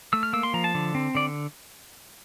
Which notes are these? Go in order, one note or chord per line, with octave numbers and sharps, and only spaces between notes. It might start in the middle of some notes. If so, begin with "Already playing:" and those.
A3 E6
F6
A#3 E6
C6
F3 A#5
A5
D3
C4
D3 D5